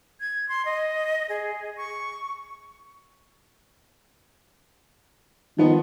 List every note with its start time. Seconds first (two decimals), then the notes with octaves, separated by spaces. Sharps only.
0.20 G#6
0.49 C6
0.65 D#5
1.29 G#4
1.77 C#6
5.58 D#3 F3 B3